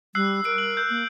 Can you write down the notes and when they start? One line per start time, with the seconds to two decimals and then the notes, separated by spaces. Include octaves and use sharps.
0.15 G3 E6 F#6 C7
0.45 A#4 D7
0.58 F#7
0.77 F#6 G6
0.90 A#3